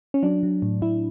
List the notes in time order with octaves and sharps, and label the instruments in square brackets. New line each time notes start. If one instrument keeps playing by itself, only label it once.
[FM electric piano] C#4
F#3 D4
F#3
A2
A2 E4